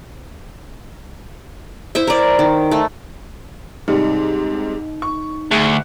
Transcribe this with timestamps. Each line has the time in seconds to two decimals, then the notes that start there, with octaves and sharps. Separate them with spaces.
1.95 E4 C5 E5
2.07 A#4 D5
2.39 D#3
2.71 A3
3.88 G#2 C3 G3 D#4
5.02 C#6
5.51 D2 G#4 F#6 C#7